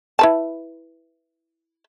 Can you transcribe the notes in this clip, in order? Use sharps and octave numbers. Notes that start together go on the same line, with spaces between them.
E4 B4 A5